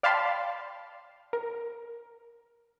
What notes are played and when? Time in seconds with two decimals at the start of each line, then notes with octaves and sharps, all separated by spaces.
0.03 D5 F5 G5 A5 B5 C6
1.33 A#4